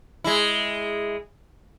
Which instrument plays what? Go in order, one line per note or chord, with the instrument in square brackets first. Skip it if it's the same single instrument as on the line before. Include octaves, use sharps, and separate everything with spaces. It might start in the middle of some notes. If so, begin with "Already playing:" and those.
[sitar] G#3 E4